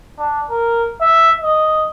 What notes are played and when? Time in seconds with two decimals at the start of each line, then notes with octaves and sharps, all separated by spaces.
0.19 D4
0.50 A#4
1.01 E5
1.42 D#5